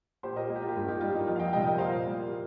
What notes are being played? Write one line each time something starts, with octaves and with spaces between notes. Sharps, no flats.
A#2 G4 C5
A#4 D#5
A#3
G4
F4
G4
G2 F4
D#4 G4
G3 A#3 F4
D#4
F2 F4
F5
D#5 G5
C3 G3 D#5 G5
A#4 D#5
A#2 C5 F5
G3 A#3